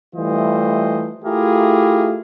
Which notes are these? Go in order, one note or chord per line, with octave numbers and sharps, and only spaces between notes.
E3 G3 A3 F4 C5 D#5
A3 E4 F4 G4 G#4 A#4